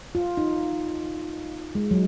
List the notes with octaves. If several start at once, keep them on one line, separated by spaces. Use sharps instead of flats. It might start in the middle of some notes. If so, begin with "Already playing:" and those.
F4
D#4
G#3
F#3